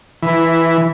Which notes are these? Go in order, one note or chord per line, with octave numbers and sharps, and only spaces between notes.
E3